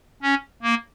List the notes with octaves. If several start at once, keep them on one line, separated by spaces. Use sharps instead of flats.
C#4
A#3